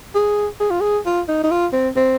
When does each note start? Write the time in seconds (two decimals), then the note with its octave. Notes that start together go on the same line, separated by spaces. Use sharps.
0.15 G#4
0.60 G#4
0.70 F4
0.81 G#4
1.05 F4
1.28 D#4
1.44 D#4
1.51 F4
1.73 C4
1.96 C4